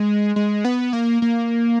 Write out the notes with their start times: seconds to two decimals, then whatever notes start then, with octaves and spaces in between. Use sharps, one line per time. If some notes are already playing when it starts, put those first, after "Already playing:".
Already playing: G#3
0.36 G#3
0.65 B3
0.93 A#3
1.22 A#3